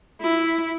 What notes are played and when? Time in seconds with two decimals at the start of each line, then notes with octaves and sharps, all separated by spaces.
0.21 E4